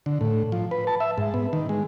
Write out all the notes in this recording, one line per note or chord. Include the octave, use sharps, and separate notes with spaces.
D3
A2
F3
B4
A5
E5
G#2
B3
D#3
G#3